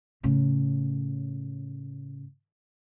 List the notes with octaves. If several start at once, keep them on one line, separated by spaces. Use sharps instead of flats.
A2 C#3